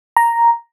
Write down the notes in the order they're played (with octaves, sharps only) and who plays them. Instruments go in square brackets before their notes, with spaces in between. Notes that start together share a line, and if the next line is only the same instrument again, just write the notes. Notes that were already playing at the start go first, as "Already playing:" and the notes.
[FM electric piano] A#5